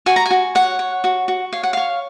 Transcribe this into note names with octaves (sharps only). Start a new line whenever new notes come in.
F#4 G#5
A#5
G#5
F#4
C#5 F#5
C#5
F#4
F#4
C#5 F5
F#5
C#5 F5